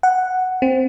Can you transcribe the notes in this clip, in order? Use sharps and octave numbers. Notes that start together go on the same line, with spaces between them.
F#5
C4